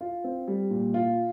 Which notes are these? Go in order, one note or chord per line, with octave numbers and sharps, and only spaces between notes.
F4
C4
G3
A#2
F4